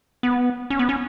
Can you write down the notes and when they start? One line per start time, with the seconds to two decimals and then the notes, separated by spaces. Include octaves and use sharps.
0.23 B3
0.70 C#4
0.79 B3
0.89 C#4